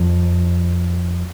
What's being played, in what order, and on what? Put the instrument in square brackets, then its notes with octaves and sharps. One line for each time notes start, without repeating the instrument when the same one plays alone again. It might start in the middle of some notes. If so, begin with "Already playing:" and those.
Already playing: [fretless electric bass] F2